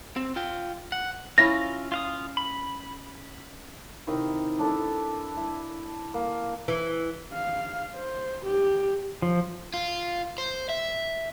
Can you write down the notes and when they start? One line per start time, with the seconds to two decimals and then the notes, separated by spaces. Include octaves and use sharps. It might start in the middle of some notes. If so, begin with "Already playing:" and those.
0.16 C4
0.36 F4 G5
0.92 F#5
1.38 C#4 E4 F4 A#6
1.92 F4 F5 D#6
2.37 B5
4.07 C3 D#3 D#4 E4
4.59 D4 E4 A4
5.37 E4 E5
6.14 A#3
6.68 E3
7.34 F5
7.94 C5
8.46 G4
9.22 F3
9.74 F4
10.38 C5
10.69 E5